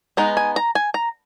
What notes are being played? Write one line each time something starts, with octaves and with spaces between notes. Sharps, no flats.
G#3 B3 D#4 A#5
G#5
A#5
G#5
A#5